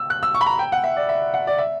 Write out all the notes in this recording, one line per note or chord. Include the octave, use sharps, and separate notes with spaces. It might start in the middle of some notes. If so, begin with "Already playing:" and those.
Already playing: E6
F#6
E6
C#6
B5
A#5
G5
F#5
E5
D5
E5
F#5
D5
E5